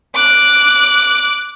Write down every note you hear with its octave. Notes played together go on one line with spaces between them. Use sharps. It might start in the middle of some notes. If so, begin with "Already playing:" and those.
D6 F#6